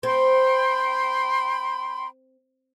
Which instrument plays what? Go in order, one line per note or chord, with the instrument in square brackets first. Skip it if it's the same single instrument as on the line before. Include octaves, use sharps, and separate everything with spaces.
[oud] C4 [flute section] G5 B5 C6